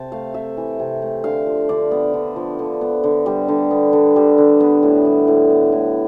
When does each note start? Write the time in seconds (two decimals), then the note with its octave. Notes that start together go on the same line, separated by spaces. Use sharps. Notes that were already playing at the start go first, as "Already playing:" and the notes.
Already playing: C3 A5
0.12 A3 F5
0.34 C3 E5
0.57 E3
0.80 C3
1.02 A3
1.24 D3 F5
1.47 F3
1.69 D3 D5
1.91 B3
2.14 D3
2.36 F3
2.59 D3
2.81 B3
3.04 D3
3.26 G3
3.48 D3
3.71 B3
3.93 D3
4.16 G3
4.38 D3
4.60 B3
4.83 A2
5.05 G3
5.27 A2
5.50 B3
5.72 A2